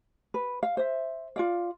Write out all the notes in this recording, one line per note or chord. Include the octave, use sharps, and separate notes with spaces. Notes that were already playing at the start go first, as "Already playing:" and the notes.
B4
F5
C5 E5
F4 D5 F5